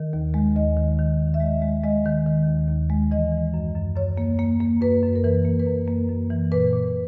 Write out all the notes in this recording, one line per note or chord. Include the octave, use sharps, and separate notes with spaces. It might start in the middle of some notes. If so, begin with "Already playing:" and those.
Already playing: D#3 A#4
D#2
G#3
D#2 D#5
D#3
D#3
D#2
E5
G#3 D#5
G#3
G#3 D#5
D#3
D#3
D#2
D#2
G#3
E3 D#5
E3
F#2
F#2
F#2 C#5
A#3
A#3
A#3
F#2 B4
F#2
A#4
E3 B4
A#3
B4
F#2 A#4
A#3
F#2
E3
A#2 B4
A#2